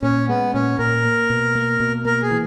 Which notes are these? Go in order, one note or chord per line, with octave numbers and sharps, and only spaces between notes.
A#2 C#4
G#3 B3
A#2 C#4
A#2 A#4
A#3
B2
A#3
B2
A#3 A#4
G#4
E3